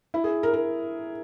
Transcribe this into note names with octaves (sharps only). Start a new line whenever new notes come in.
E4
G#4
A#4
A#4